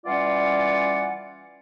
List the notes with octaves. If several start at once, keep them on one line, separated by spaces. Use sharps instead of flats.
E3 G3 C#4 F4 D5 F#5